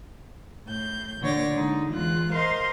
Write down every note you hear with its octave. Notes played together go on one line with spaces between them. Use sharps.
A2 G6
A#2 D3 C#5 D5 A#6
D3 G#3 D#4
E2 G#3 F4 F#6
A#4 C5 D#5 F5 C6